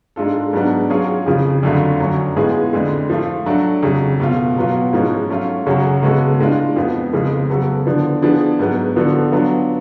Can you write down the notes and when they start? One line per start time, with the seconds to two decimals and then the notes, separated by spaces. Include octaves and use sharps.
0.16 G#2 G#3 D4 F4 A4
0.53 G#2 F#3 B3 D4
0.90 F#3 C#4 F4 G#4
1.26 F2 C#3 F3
1.63 F2 D3 F#3 A3 F4
2.00 F#2 D3 F#3 C#4
2.36 A2 G#3 B3 F4 G#4
2.73 F2 D3 G#3
3.10 F3 A3 F4
3.46 F#3 A3 D4 F#4
3.83 F2 C#3 F#3
4.20 B2 A3 F4
4.56 B2 F#3 B3 F4
4.93 G#2 F3 G#3 C#4
5.29 F#3 A3 C#4 F4
5.66 F#2 C#3 F#3 C#4 F#4
6.03 C#3 G#3 B3 F#4 A4
6.39 A2 G#3 D4 F4
6.76 F2 F3 B3
7.13 F2 C#3 F3 G#3 B3
7.50 C#3 F#3 B3 F#4 A4
7.86 D3 F3 B3 D4
8.22 F3 B3 D4 G#4
8.59 G#2 F#3 B3
8.96 D3 F3 B3 F#4 A4
9.32 F#3 B3 D4 F4